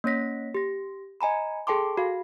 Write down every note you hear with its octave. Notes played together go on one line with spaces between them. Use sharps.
A#3 C#4 C#5 A#6 B6
G4 A#6
D#5 G#5 A#5 B5
G#4 A4 G5 A5 C6 D6
F#4 F5